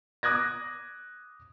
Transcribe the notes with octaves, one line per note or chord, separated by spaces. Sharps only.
D6 D#6 F#6 G#6 A#6